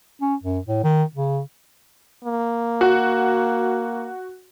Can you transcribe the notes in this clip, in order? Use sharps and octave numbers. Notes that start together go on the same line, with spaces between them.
C#4
F#2
A2
D#3
C#3
A#3
F#4